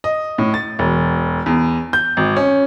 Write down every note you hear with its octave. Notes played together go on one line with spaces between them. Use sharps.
D#5
A2
A6
E1
E2
G6
G#1
C#4